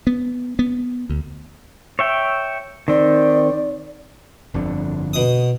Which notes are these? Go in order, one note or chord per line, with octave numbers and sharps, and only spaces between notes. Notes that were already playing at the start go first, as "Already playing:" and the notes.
B3
B3
D2
C#5 E5 G5
D#3 C4 D5
G1 F2 D3
B2 D#6